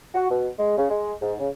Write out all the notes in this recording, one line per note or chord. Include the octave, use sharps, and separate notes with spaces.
F#4
B2
G#3
C#3
G#3
G#2
C#3